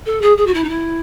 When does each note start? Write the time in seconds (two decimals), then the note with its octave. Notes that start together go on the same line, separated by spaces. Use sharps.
0.06 A4
0.21 G#4
0.37 G#4
0.46 F#4
0.54 E4
0.64 D#4
0.69 E4